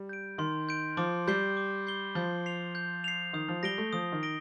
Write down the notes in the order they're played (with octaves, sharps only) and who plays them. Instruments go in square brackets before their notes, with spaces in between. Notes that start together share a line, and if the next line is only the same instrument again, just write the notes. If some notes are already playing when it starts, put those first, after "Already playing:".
Already playing: [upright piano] G3
[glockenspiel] G6 D7
[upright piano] D#3 [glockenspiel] C6
[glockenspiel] G6 D7
[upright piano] F3 [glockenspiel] D6
[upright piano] G3 [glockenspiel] G6 C7 G7
[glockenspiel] D6
G6 C7 G7
[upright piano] F3 [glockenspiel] G6
[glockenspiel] C7 F7
G6
C7 F7
[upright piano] D#3 [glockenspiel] D#6
[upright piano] F3
[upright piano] G3 [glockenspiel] A#6 D7 G7
[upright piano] A3
[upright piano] F3 [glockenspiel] D#6
[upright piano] D#3
[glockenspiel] A#6 D7 G7